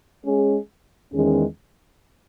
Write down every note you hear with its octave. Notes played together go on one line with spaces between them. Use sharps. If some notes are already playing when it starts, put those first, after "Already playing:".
G#3 C#4 G#4
E2 D#3 G#3 C#4 G#4